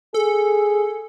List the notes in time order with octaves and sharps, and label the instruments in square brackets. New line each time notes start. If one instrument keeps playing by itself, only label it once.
[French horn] G#4 [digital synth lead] A4